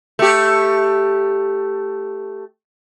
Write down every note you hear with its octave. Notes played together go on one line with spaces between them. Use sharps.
A3 G4